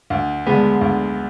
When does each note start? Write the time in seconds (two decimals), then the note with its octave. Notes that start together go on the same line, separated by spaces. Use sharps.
0.10 D2
0.47 D3 G#3 B3
0.81 D2